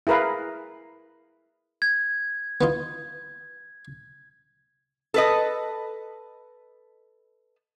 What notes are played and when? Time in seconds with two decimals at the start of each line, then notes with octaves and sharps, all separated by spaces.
0.07 E4 G#4 A#4 B4 F5
1.82 G#6
2.61 B3 D#4 F4
5.14 A4 B4 D#5